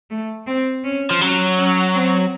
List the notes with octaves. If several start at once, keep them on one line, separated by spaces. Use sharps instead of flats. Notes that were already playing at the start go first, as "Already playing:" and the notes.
A3
C4
C#4
F3
F#3 C#4
C#4
C4